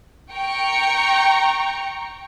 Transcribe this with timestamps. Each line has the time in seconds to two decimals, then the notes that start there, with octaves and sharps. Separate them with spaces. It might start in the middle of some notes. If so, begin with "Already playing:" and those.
0.33 G5 A#5 C#6